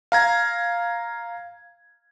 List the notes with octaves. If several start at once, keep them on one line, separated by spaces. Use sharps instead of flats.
F5 A#5 G#6